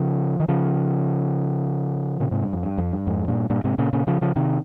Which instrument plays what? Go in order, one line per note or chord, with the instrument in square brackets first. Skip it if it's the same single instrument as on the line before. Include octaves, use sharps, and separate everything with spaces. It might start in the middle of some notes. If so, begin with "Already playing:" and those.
Already playing: [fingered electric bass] C#3 F3
D#3
C#3 F3
A#2 C#3
G#2 C3
G2
F2
G2
F2
G2
F2 G#2
G2 A#2
G2 A#2
G#2 C3
A#2 C#3
A#2 C#3
C#3 F3
C#3 F3
C3 D#3